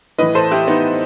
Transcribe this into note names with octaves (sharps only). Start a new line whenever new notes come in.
A2 E3 B4 D#5
A4 C5
E4 G4
B3 D#4